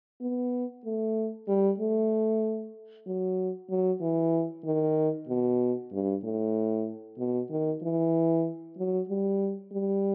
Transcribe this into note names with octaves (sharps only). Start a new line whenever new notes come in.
B3
A3
G3
A3
F#3
F#3
E3
D#3
B2
G2
A2
B2
D#3
E3
F#3
G3
G3